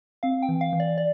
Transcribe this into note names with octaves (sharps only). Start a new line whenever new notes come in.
C4 F5
G5
E3
F5
E3
D5
D5